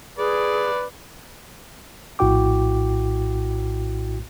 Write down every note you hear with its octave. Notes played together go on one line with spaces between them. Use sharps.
G#4 B4 D5
A#1 A2 E4 F#4 G5 D6